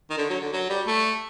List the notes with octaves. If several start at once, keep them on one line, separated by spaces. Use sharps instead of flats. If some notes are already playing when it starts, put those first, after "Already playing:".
D#3
D3
F#3
D3
F#3
G3
A3